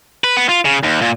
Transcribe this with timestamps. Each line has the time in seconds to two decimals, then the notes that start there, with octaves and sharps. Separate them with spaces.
0.24 B4
0.37 B3
0.49 F4
0.65 C#3
0.83 D#2
1.02 A#2